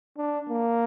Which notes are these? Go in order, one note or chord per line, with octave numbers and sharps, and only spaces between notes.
D4
A#3